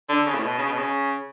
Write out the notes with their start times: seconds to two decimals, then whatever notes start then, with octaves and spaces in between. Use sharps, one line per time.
0.09 D3
0.26 C#3
0.35 A2
0.42 B2
0.58 C#3
0.69 B2
0.78 C#3